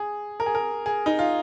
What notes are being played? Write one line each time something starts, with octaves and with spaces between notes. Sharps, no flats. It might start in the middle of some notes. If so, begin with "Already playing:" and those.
Already playing: G#4
A#4
G#4
A#4
G#4
D#4
F4